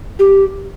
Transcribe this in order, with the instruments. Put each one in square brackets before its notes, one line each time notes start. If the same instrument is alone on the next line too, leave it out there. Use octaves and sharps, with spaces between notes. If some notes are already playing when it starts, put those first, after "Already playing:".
[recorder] G4